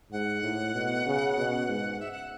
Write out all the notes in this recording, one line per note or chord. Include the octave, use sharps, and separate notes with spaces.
G#2 F#5
A2
B2
C#3
B2
G#2
E5
F#5